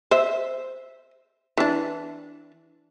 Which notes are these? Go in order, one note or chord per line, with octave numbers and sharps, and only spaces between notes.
C5 E5
E3 D4